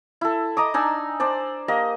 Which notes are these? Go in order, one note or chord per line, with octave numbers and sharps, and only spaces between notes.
E4 A4
D#5 A#5 D6 D#6
D4 D#4 G#5 E6
D4 C5 D5
A#3 G4 D#5